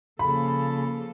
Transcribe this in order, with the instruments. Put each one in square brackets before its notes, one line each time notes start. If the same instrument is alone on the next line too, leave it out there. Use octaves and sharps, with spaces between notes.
[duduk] C#3 [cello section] F3 A#3 A4 [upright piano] B5